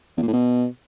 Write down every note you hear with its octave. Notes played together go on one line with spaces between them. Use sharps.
E2
A#2
A2
B2